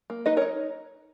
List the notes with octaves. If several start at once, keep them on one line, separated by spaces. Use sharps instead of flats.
A#3
D#4 B4 D#5
A#4 C#5
D#4